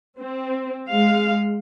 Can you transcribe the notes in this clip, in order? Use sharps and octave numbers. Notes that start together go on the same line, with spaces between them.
C4
G#3 F5